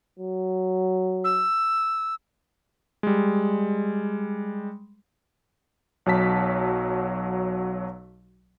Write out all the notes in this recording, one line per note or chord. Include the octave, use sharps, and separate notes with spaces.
F#3
E6
G3 G#3
B1 F#3 A5 B6